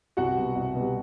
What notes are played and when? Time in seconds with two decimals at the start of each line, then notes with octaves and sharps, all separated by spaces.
0.17 C2 F#4 F#5
0.37 B2 G3
0.56 C2
0.75 B2 G3